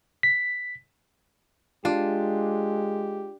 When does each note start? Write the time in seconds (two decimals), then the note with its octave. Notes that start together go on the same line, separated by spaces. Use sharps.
0.23 B6
1.85 G#3 D4 F4 G4